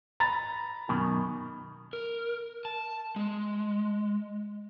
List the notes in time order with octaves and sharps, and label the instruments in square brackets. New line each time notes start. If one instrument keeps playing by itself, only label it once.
[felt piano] A#5 B5 A6
[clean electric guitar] F#2 B2 D#3
[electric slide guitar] A#4
A5
G#3